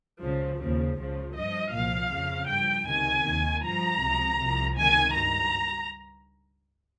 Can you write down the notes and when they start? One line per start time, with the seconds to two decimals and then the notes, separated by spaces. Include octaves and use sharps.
0.21 C#2 C#3 F3
0.59 D#2 C#3 F3
0.97 C#2 C#3 F3
1.35 G2 F3 D#5
1.73 C2 A#2 F3 F5
2.12 F2 C#3 F3
2.49 G2 F3 G5
2.88 C#2 C3 D#3 G#5
3.26 D#2 D#3
3.64 G2 F3 A#5
4.02 C#2 C3 F3
4.40 C2 C3 F3
4.78 C#2 C3 D#3 G#5
5.15 G2 A#5